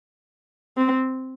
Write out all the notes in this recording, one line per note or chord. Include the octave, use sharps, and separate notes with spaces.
C4